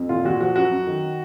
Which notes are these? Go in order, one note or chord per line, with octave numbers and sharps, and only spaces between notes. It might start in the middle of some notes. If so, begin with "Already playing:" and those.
Already playing: F2
A#2 F4
A#2 F#4
F3 F#4
F#2 F#4
F#2
D#3